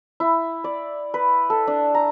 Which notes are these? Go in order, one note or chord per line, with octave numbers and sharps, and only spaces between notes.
E4
D5
B4
A4
D4
A#5